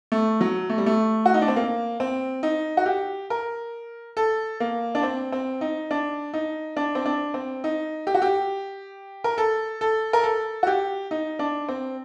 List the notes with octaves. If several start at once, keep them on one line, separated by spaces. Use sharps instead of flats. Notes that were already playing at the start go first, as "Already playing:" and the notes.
A3
F#3
A3
G3
A3
F#4
D#4
D4
C4
A#3
C4
D#4
F#4
G4
A#4
A4
A#3
D4
C4
C4
D#4
D4
D#4
D4
C4
D4
C4
D#4
G4
F#4
G4
A#4
A4
A4
A#4
A4
F#4
G4
D#4
D4
C4